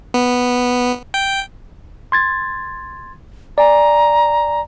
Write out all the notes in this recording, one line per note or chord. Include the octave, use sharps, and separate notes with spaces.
B3
G5
C6 G#6 A6
D5 G#5 A#5